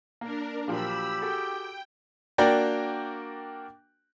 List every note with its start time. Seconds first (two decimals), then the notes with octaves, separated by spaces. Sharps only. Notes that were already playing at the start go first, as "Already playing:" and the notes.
0.21 A#3 D4 A#4
0.68 A#2 F3 F#3 G4 B5 E6
1.22 F#4 G#4 A4 G5
2.38 A#3 D4 F#4 A#4 D5 G5